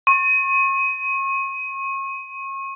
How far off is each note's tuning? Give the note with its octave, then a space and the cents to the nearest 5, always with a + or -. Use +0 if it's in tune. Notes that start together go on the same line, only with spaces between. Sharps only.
C#6 -35